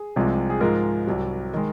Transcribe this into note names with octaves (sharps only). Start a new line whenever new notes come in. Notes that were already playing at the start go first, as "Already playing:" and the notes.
Already playing: G#4
C2 C3 F3 G#3
G#4
G#2 F3 G#3 A#4
C2 C3 F#3
D#3 G#3